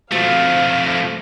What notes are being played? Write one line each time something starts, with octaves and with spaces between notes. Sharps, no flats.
F3 A3 C4 F4 F#4 F5